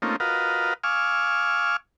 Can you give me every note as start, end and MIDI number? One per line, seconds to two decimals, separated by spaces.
0.02 0.16 57
0.02 0.16 58
0.02 0.16 60
0.02 0.16 61
0.02 0.16 63
0.02 0.16 65
0.20 0.74 65
0.20 0.74 66
0.20 0.74 70
0.20 0.74 71
0.20 0.74 75
0.20 0.74 77
0.84 1.76 77
0.84 1.76 80
0.84 1.76 85
0.84 1.76 86
0.84 1.76 88
0.84 1.76 89